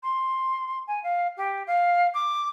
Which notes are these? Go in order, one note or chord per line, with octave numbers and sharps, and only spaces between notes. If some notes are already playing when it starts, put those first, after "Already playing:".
C6
G#5
F5
G4
F5
D6